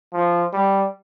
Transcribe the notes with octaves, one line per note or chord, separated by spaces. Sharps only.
F3
G3